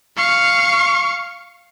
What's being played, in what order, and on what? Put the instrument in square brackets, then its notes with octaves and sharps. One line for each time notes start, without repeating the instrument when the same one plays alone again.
[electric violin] F5 C#6